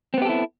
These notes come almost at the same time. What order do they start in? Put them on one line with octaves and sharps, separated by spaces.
C4 B3 G4 A4 E4